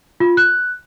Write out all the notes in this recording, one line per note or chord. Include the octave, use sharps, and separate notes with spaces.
F4
F#6